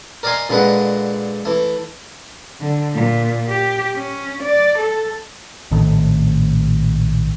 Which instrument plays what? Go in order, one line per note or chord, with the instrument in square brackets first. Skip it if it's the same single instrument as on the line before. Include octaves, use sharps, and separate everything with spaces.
[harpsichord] A#4 D5 D#5 F5 G#5 C6
A#2 D3 G#3 B4 D#5 F#5
E3 A3
[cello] D3
A#2
G4
C#4
D5
A4
[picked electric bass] A#1 A2 D#3 A3